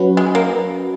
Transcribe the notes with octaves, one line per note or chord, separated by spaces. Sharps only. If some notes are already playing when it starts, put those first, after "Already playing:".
Already playing: F#3 C#4 F#4 B4
G#3
A#3